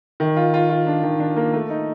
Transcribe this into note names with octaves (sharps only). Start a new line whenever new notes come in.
D#3
F4
F4
F4
D4
D#3
D4
A#3
A3
D#4